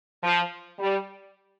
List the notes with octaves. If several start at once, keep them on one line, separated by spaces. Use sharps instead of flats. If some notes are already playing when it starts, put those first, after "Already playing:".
F3
G3